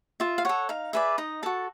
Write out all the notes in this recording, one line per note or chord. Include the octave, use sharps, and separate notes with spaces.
F4 E5
F5
A4 C#5 F#5
D#4 F5
G#4 B4 D5 E5
D#4 D#5
F#4 A4 A5